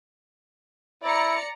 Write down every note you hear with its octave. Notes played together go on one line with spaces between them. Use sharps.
E4 D5 A#5 C#7